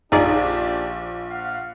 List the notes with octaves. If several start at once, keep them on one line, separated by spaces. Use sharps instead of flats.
A#1 D4 D#4 G4 G#4 D5
F5 F#5